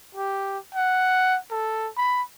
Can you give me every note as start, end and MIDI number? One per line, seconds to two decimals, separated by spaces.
0.14 0.58 67
0.74 1.38 78
1.51 1.89 69
1.97 2.22 83